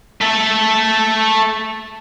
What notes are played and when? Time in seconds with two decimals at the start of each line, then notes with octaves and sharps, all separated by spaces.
0.21 A3 A4